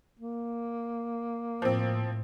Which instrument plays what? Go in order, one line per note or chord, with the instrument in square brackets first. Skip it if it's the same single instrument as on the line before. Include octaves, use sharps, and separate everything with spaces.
[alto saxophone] A#3
[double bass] A2 [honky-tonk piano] F3 C4